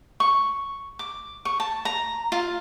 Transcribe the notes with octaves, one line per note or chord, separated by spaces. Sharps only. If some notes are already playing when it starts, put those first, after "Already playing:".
C#6
D6
C#6
A5
A#5
F4